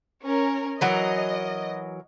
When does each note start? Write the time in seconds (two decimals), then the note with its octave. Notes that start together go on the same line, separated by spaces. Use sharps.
0.24 C#4 A#4
0.81 E3 F#3 A#4 D#5